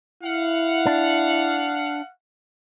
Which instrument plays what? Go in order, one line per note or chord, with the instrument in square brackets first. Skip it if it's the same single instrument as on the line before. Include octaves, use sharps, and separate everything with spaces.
[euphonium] E4 [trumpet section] F5 F#5
[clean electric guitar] D4